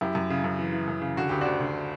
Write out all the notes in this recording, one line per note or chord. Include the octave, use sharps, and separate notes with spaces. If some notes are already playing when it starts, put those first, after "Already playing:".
F#2 E4 G4
F#2
C#3
F#2
E3
E3
F#2
C#3
D3 F#4
D2 G4
D2 D4 F#4
D3